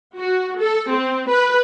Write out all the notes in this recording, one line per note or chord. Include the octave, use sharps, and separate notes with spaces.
F#4
A4
C4
B4